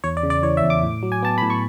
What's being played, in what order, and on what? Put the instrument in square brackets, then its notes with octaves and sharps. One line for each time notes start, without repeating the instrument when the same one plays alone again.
[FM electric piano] E2 C#5
D5
C#3
D5
E3 C#5
E5
E2
D6
A2
F#3
G#5
B3 A5
A2 B5
C#6